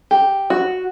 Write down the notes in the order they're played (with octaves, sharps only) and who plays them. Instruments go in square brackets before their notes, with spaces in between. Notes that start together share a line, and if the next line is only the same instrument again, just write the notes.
[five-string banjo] G4
F#4